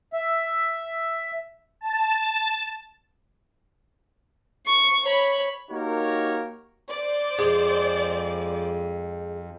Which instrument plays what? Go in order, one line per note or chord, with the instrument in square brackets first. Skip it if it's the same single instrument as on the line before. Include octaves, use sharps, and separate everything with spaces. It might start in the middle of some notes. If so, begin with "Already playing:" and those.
[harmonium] E5
[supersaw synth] A5
[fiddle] C#6
C#5 B5
[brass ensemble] A#3 D#4 F#4 G4 A#4 C#5
[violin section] C5 D5
[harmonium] F2 [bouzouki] G#3